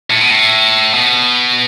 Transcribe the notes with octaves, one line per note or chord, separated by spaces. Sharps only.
A2
B2
A2
B2